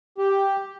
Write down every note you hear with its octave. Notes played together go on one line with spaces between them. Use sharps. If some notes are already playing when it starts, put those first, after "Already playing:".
G4